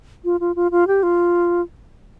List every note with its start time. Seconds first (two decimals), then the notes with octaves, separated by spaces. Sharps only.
0.25 F4
0.40 F4
0.56 F4
0.71 F4
0.87 G4
1.03 F4